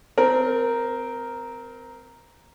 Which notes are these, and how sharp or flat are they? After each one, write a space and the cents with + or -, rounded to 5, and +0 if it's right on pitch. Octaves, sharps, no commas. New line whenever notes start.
C4 -25 A#4 +0